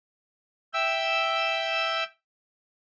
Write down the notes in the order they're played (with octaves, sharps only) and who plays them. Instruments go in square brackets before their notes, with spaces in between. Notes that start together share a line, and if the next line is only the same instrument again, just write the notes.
[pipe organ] E5 G5 E6